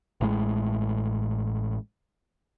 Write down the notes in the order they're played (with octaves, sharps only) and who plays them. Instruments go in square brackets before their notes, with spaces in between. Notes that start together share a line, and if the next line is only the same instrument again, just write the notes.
[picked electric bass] A1 A2 G#3